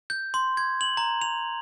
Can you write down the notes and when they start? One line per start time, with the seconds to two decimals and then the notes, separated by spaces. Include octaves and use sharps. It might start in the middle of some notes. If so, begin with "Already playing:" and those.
0.10 G6
0.34 C6
0.57 G#6
0.81 F#7
0.97 A#5
1.22 F7